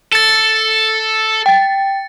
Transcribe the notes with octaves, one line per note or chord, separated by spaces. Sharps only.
A4 A6 C#7
G5 A6